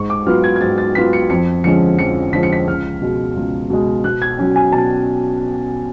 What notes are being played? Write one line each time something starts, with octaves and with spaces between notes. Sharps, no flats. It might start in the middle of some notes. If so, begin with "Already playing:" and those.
Already playing: G#2 C#6
D6
F#3 B3 F4 F6
G#6
G#6
G#2 A6
A6
F#3 B3 F4 B6
C#7
F2 C#7
D3 F3 G#3 C#4 C#7
F2 C#7
D3 F3 G#3 C#4 B6
C#7
B6
C#2 F6
B2 G#3
C#2
B2 G#3
B2 F#6
G#6
F#3 C#4
G#5
B2 A5